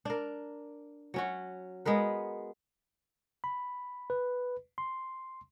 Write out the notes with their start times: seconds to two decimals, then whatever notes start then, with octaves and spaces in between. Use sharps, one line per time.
0.05 D4 A#4
1.14 F#3 C#4 F#4
1.85 G#3 B3 A#4 B4
3.44 B5
4.10 B4
4.78 C6